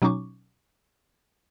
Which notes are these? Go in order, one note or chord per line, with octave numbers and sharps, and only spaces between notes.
B2 F#3 C#4 D#4 C#6 D6